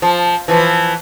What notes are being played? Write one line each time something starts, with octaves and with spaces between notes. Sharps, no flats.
F3
E3 F3